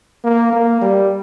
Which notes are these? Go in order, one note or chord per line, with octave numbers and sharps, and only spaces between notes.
A#3
A#3
G3